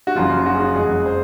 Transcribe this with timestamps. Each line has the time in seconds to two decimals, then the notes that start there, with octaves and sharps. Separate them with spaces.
0.07 F#4
0.15 F#1 F#2 C#3 F3 F4
0.46 F#4
0.53 G#4
0.60 F#4
0.75 F2 C#3 G#3 G#4
1.06 C5